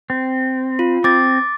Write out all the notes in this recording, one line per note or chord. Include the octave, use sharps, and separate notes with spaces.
C4
F4
C4 D6 A6